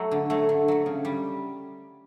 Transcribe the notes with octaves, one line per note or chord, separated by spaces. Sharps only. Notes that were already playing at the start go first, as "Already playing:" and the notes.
Already playing: F#3 A3
D3
F#3 A3
D3
F#3 A3
C#3
G3